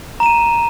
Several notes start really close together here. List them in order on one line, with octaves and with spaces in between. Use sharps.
A#5 E7 D#7